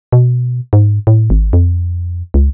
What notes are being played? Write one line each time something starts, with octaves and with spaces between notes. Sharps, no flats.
B2
G#2
A2
G#1
F2
C#2